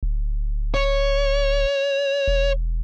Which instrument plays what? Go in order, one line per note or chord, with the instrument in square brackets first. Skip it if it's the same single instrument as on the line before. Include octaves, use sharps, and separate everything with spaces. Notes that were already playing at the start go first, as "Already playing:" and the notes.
[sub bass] D1
[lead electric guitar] C#5
[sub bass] E1